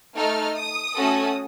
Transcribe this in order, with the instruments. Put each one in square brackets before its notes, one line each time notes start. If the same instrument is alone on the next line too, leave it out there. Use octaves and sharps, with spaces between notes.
[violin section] A3 D#4 A4 F6
D#6
A3 C#4 F#4 A4